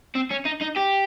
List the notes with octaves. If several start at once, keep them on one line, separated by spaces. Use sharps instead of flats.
C4
C#4
D#4
D#4
G4